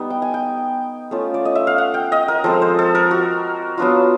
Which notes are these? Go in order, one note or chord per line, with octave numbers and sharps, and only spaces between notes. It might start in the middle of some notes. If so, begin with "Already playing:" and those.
Already playing: G3 B3 D#4
G5
G#5
G5
A3 C#4 F4
D5
D#5
E5
F5
F#5
G5
D#5
A#4
F3 G#3 C4 A4
C5
A4
A#4
F#4
F#3 B3 D4 F4